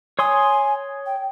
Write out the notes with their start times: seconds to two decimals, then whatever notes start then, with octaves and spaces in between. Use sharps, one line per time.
0.19 C#5 G#5 C6 D#6
1.06 G5